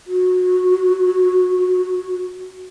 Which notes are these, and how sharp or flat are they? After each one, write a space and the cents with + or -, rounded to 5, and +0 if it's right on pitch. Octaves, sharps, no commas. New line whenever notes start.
F#4 -20